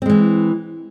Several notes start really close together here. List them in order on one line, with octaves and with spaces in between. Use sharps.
C4 G#3 E3